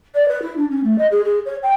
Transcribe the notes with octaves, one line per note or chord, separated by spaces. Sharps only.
D5
B4
E4
D4
C#4
A3
D#5
G#4
G#4
C#5
G5